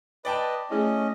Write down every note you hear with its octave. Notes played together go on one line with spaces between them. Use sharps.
B4 D5 D#5 G5 A5
A3 C#4 E4 G#4 D#5